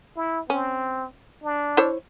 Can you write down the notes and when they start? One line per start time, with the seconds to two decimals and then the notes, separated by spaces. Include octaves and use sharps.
0.17 E4
0.50 C4 C#4
1.44 D4
1.77 E4 C5 C#5